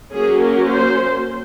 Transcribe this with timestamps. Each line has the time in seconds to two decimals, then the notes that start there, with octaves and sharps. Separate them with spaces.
0.13 F#3 A#3 C#4 G#4
0.42 A#4
0.71 C5